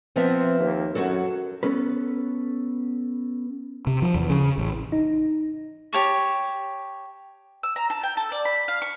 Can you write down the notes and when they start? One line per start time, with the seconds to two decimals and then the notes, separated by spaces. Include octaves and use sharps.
0.16 F3 B3 C4 E5
0.60 D#2
0.95 F#2 F#3 F#4 A4
1.63 B3 C#4 A4 B4
3.87 C3
4.02 F3
4.15 E2
4.30 C#3
4.58 A1
4.92 D#4
5.93 G4 C#5 A5 C#6
7.63 E6
7.76 A#5
7.90 A5
8.03 G5
8.17 A4
8.32 D5
8.45 B5
8.68 F5
8.82 C#6